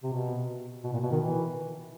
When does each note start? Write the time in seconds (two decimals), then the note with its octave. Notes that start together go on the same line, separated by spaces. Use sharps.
0.03 C3
0.13 B2
0.84 B2
0.93 A#2
1.03 B2
1.11 D#3
1.20 E3